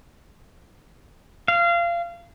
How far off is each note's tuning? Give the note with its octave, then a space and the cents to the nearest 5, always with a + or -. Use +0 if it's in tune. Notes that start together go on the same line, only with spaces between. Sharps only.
F5 -25